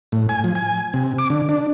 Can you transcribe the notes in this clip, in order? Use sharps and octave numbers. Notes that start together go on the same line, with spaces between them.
A2
G#5
F3
G#5
C3
D6
D3
D4